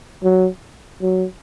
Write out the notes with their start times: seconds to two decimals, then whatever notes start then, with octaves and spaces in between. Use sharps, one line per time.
0.24 F#3
1.02 F#3